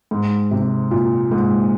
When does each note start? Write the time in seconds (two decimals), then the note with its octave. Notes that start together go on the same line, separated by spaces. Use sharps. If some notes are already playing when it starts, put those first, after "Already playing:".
0.11 G#2
0.51 C3
0.91 A#2
1.31 G#2